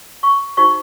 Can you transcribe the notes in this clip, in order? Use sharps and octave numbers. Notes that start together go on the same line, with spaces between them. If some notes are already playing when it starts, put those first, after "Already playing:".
C#6
D#4 F#4 C5 C#6